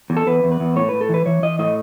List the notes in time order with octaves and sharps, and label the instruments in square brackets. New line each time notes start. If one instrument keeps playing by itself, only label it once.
[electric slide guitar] E2
A4
E2 B4
E2
B4
E2
A2 C#5
A2 B4
A4
E3 B4
E3 C#5
E3 D#5
A2 D#5